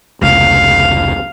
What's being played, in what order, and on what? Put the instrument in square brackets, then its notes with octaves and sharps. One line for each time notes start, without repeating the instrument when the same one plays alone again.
[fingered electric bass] F1 C#2 [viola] F5